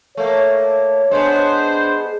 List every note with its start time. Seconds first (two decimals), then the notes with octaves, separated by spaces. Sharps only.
0.17 A3 A#3 C#5
1.11 G#3 B3 D4 C5